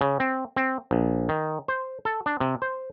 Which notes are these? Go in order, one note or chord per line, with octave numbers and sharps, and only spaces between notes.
C#3
C4
C4
A#1
D#3
C5
A4
D4
C3
C5